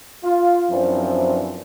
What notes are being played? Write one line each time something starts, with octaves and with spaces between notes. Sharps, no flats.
F4
F#2 E3 F3 C4 D4 E4